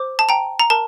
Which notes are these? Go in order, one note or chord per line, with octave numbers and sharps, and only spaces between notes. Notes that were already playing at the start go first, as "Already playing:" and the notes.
Already playing: C5 D6
A5
G5 A#5
A#5
A#4 A5